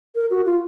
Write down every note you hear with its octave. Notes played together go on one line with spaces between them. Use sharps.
A#4
F#4
F4